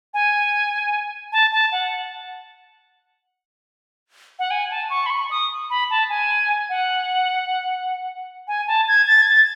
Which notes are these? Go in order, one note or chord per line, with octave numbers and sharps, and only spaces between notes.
G#5
A5
A5
F#5
F#5
G#5
A5
C#6
B5
C#6
D#6
B5
A5
G#5
F#5
G#5
A5
G#6
A6
G#6
A6